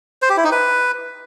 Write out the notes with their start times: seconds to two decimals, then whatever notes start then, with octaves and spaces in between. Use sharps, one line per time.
0.22 C5
0.30 G4
0.37 E4
0.44 D#4
0.52 B4